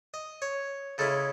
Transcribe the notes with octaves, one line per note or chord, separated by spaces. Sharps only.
D#5
C#5
C#3 G#3 C#4 E4 A4